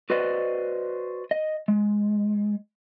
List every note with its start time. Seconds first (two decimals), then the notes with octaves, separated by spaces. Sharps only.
0.10 F#4 B4 C5 D5 D#5
1.31 D#5
1.68 G#3